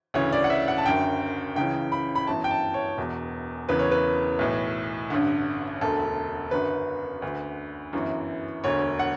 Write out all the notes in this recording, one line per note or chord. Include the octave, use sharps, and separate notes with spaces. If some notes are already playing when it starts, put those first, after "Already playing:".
D2 C#3 E3 C#5
D5
F#5
E5
F#5
A5
F#1 F#2 D3 G5
C#2 C#3 E3 G5
B5
B5
G1 F#2 E3 A5
G5
A5
C#5
E1 E2 B2
E1 E2 C#3 E3 B4
C#5
B4
B1 A2 E3
A1 G2 D3
E1 D2 D3 A4
F#1 F#2 D3 B4
D2 D3
G1 F#2 E3
E1 D2 D3 C#5
F#5